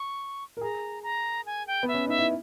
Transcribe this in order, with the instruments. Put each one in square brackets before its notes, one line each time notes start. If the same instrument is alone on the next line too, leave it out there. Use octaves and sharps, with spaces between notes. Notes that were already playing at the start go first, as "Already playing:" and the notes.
Already playing: [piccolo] C#6
[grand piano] A#4
[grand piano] G#4 [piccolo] A#5
[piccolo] A#5
G#5
G5
[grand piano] B3
[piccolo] E5
[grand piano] C#4
[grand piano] D#4 [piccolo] E5
[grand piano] E4